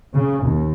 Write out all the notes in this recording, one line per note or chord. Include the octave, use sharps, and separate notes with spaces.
C#3
D#2